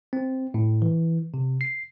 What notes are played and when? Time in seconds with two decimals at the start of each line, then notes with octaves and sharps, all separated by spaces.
0.13 C4
0.54 A2
0.82 E3
1.34 C3
1.61 C7